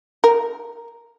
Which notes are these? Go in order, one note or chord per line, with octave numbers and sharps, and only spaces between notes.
A#4